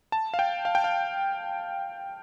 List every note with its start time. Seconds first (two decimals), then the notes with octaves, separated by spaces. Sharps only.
0.12 A5
0.34 F5
0.39 G5
0.65 F5
0.75 G5
0.84 F5